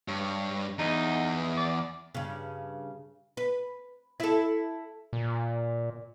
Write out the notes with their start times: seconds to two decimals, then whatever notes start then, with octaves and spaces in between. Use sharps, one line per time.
0.08 G2 C#5
0.79 E2 D#4
1.57 D5
2.14 G2 C#3
3.37 B4
4.20 E4 A4
5.13 A#2